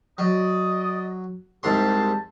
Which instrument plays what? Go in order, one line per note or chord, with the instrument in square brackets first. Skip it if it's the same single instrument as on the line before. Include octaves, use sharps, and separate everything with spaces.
[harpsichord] F#3 [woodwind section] D5 D#5
[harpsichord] C2 G#2 C6 [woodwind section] G4 A5